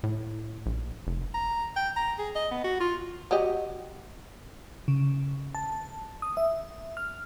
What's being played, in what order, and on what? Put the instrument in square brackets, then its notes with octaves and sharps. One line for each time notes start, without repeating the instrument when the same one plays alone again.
[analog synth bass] A2
A#1
F1
[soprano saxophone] A#5
G5
A#5
G#4
D#5
B3
F#4
F4
[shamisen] F#3 G4 D#5
[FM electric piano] C#3
A5
D#6
E5
F6